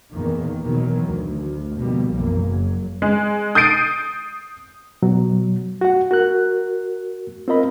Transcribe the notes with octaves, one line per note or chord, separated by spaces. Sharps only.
E2 A#2 D#3 A#3
B2 D#3 E3 F#3
D2
B2 D3 D#3 F3 G3 A#3
B1 F#2 E3 A#3
F#1 F#3
G#3
D#6 G6 A6 C7 D7 D#7
B2 F#3
F#4 F#5
F#4 A#4 F#6
C4 F4 A#4 D#5 B5